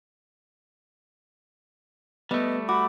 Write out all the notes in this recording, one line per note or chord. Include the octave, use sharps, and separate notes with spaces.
G3 A3 B3 D#5
F#4 B5 D6